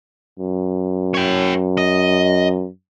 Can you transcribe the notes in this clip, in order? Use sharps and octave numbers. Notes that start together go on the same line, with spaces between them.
F#2
C#5 G5
D#5